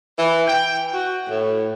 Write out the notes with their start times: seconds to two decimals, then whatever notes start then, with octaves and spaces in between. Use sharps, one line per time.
0.19 E3
0.48 G5
0.94 F#4
1.30 A2